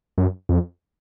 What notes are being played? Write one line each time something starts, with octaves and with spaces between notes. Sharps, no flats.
F#2
F2